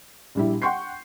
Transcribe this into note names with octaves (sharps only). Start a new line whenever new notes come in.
A#1 G3 E4
F#5 G5 C6 C#6 G6 C7